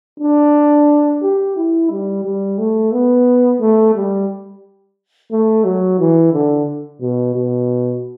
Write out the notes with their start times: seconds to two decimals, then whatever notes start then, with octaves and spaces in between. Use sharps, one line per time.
0.20 D4
1.22 G4
1.56 E4
1.91 G3
2.25 G3
2.58 A3
2.92 B3
3.60 A3
3.95 G3
5.31 A3
5.64 F#3
5.99 E3
6.33 D3
7.01 B2
7.35 B2